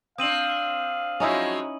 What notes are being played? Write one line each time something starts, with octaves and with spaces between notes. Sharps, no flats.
C4 D4 F5 D#6 D#7 F#7
F3 F#3 G#3 C#4 D#4 E4